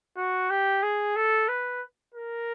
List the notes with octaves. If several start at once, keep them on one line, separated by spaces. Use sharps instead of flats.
F#4
G4
G#4
A4
B4
A#4